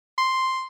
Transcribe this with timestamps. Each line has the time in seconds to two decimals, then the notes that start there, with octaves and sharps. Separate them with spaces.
0.18 C6